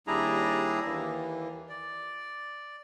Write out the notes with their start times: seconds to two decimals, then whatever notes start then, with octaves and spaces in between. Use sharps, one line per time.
0.07 D#2 G3 D4 E4 G#4 A#5
0.86 D#2 E3 A#3
1.69 D5